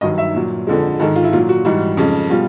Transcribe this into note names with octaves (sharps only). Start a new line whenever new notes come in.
G2 D#3 F#3 D#5
E5
A#2 F#3
F2 D3 F3 G#3
G#2 D#3 G#3 A4
F4
E4
A#2 F#3 F4
F#4
G#2 E3 G3 F#4
F2 C#3 F3 G#3
B2 G3 F4